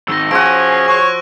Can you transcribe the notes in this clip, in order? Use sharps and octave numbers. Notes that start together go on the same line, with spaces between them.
G#2 D#3 E6 A#6
F3 C#4 F#4 G#4 D7
C#5 C#6 F#6